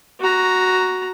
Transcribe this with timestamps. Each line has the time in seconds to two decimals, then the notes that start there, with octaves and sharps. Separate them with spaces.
0.20 F#4 A#5